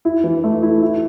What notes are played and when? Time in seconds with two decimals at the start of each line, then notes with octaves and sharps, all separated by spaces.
0.05 E4
0.24 E3
0.44 A3
0.62 E4
0.82 E4